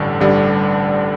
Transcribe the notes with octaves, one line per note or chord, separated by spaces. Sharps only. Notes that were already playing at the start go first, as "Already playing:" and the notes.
Already playing: A1 G2 D3 G3 D4
A1 G2 D3 G3 D4